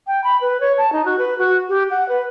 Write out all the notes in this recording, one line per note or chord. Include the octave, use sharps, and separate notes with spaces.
G5
B5
B4
C#5
A5
D#4
F#4
B4
F#4
G4
F#5
B4